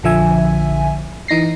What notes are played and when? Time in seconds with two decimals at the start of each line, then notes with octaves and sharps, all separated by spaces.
0.03 A#1 D3 F3 E5 G#5
1.28 E3 D#4 A#6 C7